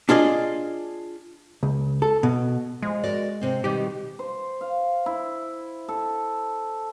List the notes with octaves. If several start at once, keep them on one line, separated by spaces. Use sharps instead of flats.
D4 F4 G#4 D#5
C#2
A4
B2
F3 G#3
F#4 A#4 D5
C3 C4
B2 D#3 G3 G4
C5
F5
E4
A4